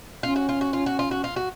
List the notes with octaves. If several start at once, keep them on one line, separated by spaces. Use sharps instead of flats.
C#4 F4
F#4
F4
F#4
F4
F#4
F4
F#4
F4
F#4